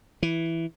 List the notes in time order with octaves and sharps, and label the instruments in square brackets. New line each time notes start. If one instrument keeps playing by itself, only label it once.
[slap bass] E3